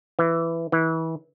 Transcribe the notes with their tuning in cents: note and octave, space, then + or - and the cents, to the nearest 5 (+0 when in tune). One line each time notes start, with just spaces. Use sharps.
E3 +10
E3 -25